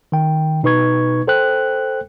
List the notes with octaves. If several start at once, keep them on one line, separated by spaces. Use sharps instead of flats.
D#3 G5
B2 D#4 B4 C#6 G#6
A4 C5 G5 F#6